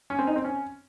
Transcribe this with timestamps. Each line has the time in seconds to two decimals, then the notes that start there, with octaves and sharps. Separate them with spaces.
0.10 C#4
0.19 C4
0.27 D#4
0.36 C4
0.44 C#4